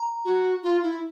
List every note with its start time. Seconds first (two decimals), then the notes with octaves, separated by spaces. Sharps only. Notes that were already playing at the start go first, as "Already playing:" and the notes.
Already playing: A#5
0.25 F#4
0.63 F4
0.83 E4